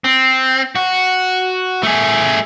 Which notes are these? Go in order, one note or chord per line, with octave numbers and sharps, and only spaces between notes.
C4
F#4
A3 G#4